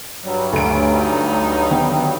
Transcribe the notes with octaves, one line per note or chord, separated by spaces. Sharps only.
G2 F#3 G3
D2 A3 D7
D#4
D3 D#3 B3 G5